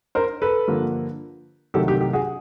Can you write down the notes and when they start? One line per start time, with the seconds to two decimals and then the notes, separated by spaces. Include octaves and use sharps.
0.15 A#4 C5
0.42 A4 B4
0.68 G2 D3 F3 A#3
1.74 C2 C3 D#3 F#3 A3 G4 A4
1.88 G4
2.01 G4
2.13 F#4 G#4